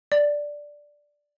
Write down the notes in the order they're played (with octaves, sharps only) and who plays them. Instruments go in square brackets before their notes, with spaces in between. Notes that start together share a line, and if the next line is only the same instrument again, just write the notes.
[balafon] D5